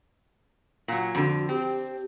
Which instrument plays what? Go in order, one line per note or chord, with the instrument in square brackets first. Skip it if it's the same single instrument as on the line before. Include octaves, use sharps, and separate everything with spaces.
[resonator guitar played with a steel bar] A#2 F#3
[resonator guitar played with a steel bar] F2 D3 [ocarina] F#4
[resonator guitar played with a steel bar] C4 [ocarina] G4